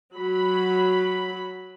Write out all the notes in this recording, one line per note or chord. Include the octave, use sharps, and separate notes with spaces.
F#3 B5